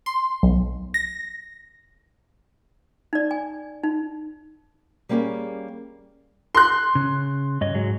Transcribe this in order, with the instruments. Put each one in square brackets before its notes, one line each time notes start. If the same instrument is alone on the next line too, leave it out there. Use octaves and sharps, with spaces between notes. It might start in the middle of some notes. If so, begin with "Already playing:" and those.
[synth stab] C6
B1
A#6
[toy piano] D#4 D5
G#5
D#4
[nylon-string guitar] G3 A#3 B3 C#4 G4 G#4
[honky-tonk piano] C6 F#6
[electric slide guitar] C#3
G2 C#5 D#5
G#2 F#3 G#3